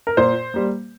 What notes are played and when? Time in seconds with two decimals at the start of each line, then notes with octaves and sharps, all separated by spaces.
0.07 A#4
0.17 A#2 C5
0.54 G3 A#3